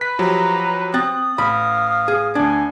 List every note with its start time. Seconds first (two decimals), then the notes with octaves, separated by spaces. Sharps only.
0.01 B4 B6
0.19 F3 F#3 G4 A#5
0.94 C4 D#6 F#6 A6
1.38 A1 F5 B5
2.08 G#4
2.35 D2 D4 G#5 G#6